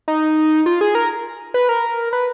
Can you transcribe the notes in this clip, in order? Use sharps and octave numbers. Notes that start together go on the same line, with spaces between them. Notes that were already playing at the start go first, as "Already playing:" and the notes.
D#4
F4
G#4
A#4
B4
A#4
B4